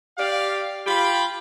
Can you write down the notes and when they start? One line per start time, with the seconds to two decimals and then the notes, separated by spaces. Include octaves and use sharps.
0.18 G4 D5 F5
0.87 F4 G4 B5